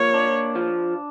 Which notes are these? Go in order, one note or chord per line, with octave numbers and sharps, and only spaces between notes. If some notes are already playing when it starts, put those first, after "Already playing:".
Already playing: F3 A#3 C#5
D4
F3